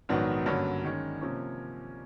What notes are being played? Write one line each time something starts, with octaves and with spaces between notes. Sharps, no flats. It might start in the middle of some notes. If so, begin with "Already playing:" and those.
A#1 G#2 D#3 F#3 B3
G2 D3 F#3 A#3 C#4
D#3 G#3 C#4
C3 F3 A#3 C#4